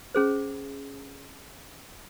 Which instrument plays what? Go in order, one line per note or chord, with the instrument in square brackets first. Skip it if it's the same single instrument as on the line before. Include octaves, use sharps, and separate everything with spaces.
[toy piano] C#4 G#4 C5